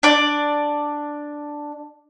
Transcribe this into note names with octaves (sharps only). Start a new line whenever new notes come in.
D4 D5